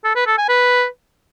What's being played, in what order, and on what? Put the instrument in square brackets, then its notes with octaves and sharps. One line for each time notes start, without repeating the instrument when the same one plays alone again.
[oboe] A4
B4
A4
G#5
B4